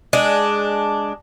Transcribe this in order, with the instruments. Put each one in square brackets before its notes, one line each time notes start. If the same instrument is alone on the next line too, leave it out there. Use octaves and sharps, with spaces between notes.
[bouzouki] G#3 D4